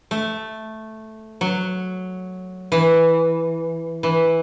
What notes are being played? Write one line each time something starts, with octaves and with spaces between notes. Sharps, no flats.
A3
F#3
E3
E3